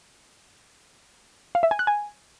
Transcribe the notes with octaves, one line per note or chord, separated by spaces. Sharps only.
F5
E5
G#5
F#6
G#5